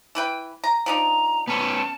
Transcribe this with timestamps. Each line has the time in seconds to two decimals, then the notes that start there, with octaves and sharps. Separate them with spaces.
0.15 E3 B4 G5
0.64 A#5
0.86 F3 D4 D#4 A#5
1.48 B3 C#4 A5